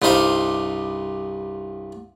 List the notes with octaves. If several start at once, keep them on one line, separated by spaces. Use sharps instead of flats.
C2 G2 G3 D#4 C5 F5